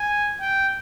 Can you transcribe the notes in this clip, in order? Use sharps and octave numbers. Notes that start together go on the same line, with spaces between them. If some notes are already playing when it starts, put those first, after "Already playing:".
Already playing: G#5
G5